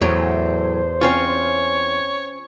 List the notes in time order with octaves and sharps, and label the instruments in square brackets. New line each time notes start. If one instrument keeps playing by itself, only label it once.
[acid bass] E2 [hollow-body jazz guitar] A2 F#3 [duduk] C5
[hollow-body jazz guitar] C4 C#4 F4 [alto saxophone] C#5